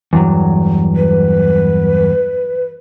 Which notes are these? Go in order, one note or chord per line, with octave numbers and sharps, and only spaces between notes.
E2 G2 F#3
B4